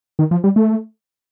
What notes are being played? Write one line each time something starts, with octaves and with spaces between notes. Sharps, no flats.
D#3
F3
G3
A3